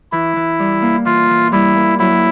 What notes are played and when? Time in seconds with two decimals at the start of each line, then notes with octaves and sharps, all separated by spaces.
0.12 E3 E4
0.36 E3
0.59 G3
0.82 A#3
1.05 E3 F4
1.30 E3
1.52 G3 E4
1.76 A#3
1.99 F#3 E4